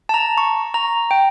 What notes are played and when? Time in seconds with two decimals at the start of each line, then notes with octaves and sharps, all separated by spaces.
0.09 A5
0.14 A#5
0.38 C#6
0.74 A#5
1.11 G5